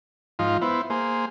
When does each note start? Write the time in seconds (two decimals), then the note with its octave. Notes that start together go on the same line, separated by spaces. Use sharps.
0.39 G#2 F3 D#4 F4
0.62 B3 E4 C5
0.90 A#3 G#4 C5